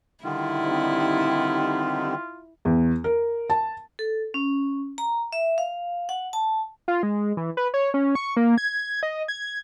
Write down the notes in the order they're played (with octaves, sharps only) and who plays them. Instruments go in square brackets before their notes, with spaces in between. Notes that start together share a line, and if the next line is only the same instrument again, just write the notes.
[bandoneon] D3 D#3 G3 [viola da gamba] E4 [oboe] F4
[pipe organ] C4 D#4 G4
[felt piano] E2
A#4
A5
[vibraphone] A4
C#4
A#5
E5
F5
F#5
A5
[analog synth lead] F4
G#3
E3
B4
C#5
C#4
C#6
A#3
G#6
D#5
G#6